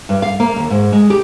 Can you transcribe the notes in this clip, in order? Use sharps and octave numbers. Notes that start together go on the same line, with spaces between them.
G2
F5
A#3
D#2
G#2
G#3
G4